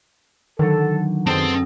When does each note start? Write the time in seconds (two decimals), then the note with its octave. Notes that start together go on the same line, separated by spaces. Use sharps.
0.59 D3 D#3 F#3 A4
1.27 F#2 B2 G#3 C4 A4 C5 A5 D#6